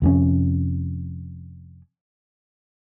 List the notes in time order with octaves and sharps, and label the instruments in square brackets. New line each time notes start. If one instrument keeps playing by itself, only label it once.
[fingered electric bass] F1 F2 G#2 C#4